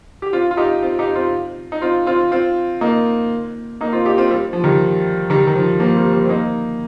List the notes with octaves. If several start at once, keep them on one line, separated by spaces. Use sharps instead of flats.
G4
C4 F4
F4
D#4 G4
C4 F4
D#4 G4
C4 F4
D#4
C4 F4
C4 F4
C4 F4
A#3 D#4
A#3 D#4
C4 F4
D#4 G4
C4 F4
G3 C4
F3
D#3 G3
D#3 G3
D#3
F3
F3 A#3
G3 C4
G3 C4
C4
A#3 D#4